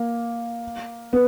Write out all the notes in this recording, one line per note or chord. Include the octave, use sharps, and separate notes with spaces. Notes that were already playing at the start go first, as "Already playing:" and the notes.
Already playing: A#3
B3